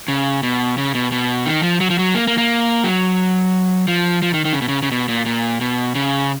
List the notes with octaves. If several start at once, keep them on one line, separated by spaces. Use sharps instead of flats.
C#3
B2
C#3
B2
B2
D#3
F3
F#3
F3
F#3
A#3
A#3
A#3
F#3
F3
F3
D#3
D#3
C#3
B2
C#3
C#3
B2
A#2
A#2
B2
C#3